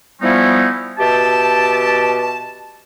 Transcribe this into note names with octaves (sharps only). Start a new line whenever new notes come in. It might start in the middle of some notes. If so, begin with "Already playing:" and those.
F3 G3 B3 C#4 D#4 E4
B2 G4 E5 A5